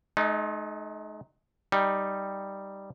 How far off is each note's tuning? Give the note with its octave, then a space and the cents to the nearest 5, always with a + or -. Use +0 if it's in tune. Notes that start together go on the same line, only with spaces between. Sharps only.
G#3 +45 D#4 -10
G3 +0 D#4 +0